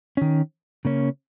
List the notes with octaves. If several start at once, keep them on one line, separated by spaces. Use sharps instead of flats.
D#3 C#4
C#3 A#3 C#4